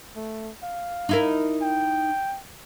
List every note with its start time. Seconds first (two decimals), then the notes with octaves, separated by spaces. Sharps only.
0.16 A3
0.63 F5
1.09 D#4 E4 A#4
1.62 G5